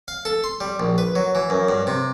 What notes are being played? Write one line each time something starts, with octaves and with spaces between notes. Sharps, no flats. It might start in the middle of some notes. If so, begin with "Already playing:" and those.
F5
A4
C6
G3
A#1
B4
F#3
E3
F#2
G2
C3